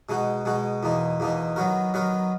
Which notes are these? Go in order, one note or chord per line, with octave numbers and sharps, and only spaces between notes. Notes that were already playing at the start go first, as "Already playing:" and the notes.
B2 G#3 D#4 F#4
B2 G#3 D#4 F#4
E2 B2 A#3 D#4
E2 B2 A#3 D#4
D#3 F#3 B3 F#4 A#4
D#3 F#3 B3 F#4 A#4